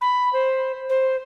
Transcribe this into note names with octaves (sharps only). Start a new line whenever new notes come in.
B5
C5
C5